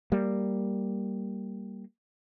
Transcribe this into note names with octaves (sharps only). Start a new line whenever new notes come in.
G3 A#3